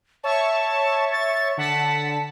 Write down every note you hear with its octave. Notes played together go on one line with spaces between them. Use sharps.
C#5 E5 A5 C#6
A6
D3 F#5 A5 B6